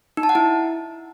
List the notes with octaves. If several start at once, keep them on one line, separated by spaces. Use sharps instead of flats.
D#4
A5
F#5
E4